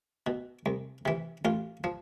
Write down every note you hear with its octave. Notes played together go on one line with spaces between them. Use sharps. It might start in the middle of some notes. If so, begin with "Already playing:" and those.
B2
C2
C3 E3
A1 F4
F3